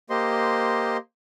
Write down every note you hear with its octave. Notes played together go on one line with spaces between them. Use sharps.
A#3 G4 C5 D#5 C6